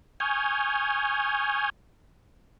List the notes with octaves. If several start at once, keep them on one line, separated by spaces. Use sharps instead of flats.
G#5 C#6 D#6 F6 G6 G#6